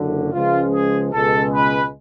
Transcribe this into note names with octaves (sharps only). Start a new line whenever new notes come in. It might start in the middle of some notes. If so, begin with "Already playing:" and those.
Already playing: F#1 F#2 D3
C#2 C#3 F3 G#3 F4
G#4
C#2 B2 G#3 A4
B4